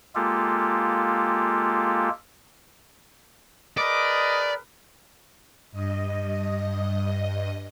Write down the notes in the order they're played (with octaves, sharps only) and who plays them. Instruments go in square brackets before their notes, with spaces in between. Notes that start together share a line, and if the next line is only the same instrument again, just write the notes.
[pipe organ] G#3 A#3 F4 G4 A4
[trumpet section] G#4 A#4 B4 [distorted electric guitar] D5 [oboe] D#5
[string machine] G2 D#5